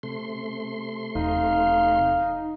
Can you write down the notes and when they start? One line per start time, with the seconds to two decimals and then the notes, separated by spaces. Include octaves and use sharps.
0.03 C3 A3 C6
1.15 E1 D#4 F5